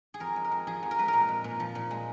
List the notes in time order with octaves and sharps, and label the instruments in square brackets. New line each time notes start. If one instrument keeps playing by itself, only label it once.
[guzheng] G#4
F2 A#4
G#3
A#4
F2
F3 G#4
F2
A#4
G#3 B4
A#2 A#4
G#3
A#2
F3
A#2
G#3